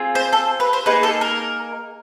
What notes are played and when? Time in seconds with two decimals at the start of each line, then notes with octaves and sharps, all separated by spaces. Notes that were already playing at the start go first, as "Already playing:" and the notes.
Already playing: C4 F4 G#4
0.15 C5
0.33 A4
0.60 B4
0.73 C5
0.86 A#3 D#4 G#4 B4
1.03 A4
1.21 A#4